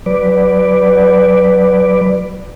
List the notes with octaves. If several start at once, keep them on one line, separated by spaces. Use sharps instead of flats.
F#3 B4 D5